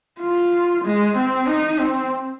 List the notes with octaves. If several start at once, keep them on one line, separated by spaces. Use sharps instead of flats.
F4
G#3
C4
D#4
C4